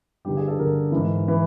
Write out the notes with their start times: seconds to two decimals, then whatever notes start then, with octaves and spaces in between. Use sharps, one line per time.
0.25 G2 D3 G4
0.37 G#4
0.48 A4
0.58 G2 D3 A#4
0.92 G#2 E3
1.28 E3